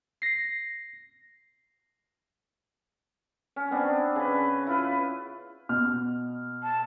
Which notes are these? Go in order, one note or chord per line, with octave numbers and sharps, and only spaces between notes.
A#6 C7
C#4
B3 C4 D4
C#3 B4
E4 F4 B4
B2 F6
A5